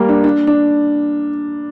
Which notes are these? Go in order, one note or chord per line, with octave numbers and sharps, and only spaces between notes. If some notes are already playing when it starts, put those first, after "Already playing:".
Already playing: G3 A#3
D4
D4
D4